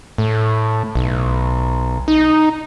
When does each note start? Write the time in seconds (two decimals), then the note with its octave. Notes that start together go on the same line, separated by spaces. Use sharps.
0.18 A2
0.95 B1
2.08 D#4